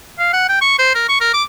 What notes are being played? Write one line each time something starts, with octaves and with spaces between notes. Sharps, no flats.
F5
F#5
G5
C#6
C5
A#4
C#6
A#4
D6